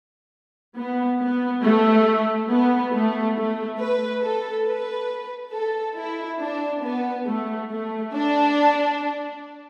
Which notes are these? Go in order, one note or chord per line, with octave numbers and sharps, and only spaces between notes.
B3
B3
A3
B3
A3
A3
B4
A4
B4
A4
E4
D4
B3
A3
A3
D4